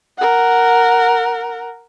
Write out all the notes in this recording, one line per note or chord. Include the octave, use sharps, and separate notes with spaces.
A#4 F#5